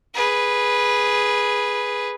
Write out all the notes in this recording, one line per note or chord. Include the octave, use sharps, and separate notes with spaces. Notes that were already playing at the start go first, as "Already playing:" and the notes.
G#4 B4